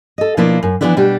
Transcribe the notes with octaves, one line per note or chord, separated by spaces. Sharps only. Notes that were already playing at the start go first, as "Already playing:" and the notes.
A4 D#5
B2 F3 A#3 D4 E4 F4
F#2
E3 F3 G3 B3 D4 E4
B2 G3 D4 G4